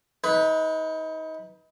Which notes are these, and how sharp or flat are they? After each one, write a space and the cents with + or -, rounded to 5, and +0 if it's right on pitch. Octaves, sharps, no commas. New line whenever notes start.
D#4 +30 B4 -5